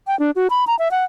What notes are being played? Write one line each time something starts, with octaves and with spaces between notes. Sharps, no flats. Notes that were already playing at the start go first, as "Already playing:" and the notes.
G5
D4
F#4
B5
A#5
E5
F#5